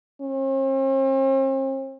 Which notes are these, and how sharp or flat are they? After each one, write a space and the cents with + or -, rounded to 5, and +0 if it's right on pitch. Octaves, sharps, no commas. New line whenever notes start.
C4 +45